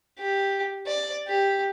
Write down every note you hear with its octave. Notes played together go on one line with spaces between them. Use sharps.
G4
D5
G4